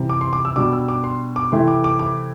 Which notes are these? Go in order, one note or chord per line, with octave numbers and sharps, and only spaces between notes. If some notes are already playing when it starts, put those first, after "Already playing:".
Already playing: C3 E3 G3
D6
C6
D6
E6
B2 G3 D4 D6
E6
D6
C6
D6
C3 E3 A3 C4 E4 C6
D6
D6
D6